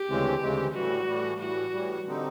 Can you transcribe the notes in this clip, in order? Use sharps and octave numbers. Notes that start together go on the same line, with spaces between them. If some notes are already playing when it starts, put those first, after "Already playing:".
Already playing: G4
D2 C#3 E3 G#3 C4
D2 C#3 E3 G#3 C4
A2 E3 G3 F#4
A2 E3 G3
A2 E3 G3 F#4
A2 E3 G3
D3 G3 C4 D#4